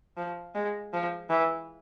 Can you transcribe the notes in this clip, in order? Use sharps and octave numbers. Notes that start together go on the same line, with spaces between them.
F3
G#3
F3
E3